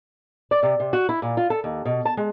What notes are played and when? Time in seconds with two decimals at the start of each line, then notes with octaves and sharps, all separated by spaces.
0.51 D5
0.63 C3
0.80 C3
0.93 F#4
1.09 E4
1.22 A#2
1.37 F4
1.50 A4
1.64 D#2
1.85 B2
2.05 A5
2.17 G#3